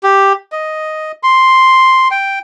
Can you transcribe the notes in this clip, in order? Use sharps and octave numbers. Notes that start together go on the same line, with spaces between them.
G4
D#5
C6
G5